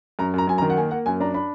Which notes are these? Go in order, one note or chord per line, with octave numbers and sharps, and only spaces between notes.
F#2 A#5
F#2 A#5
F#2 G#5
A#5
D#3
F#5
A#3 G#5
A#3 F#5
F#2 G#5
D4 A#5
D4 B5